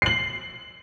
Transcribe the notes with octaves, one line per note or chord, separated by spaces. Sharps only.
C7 F#7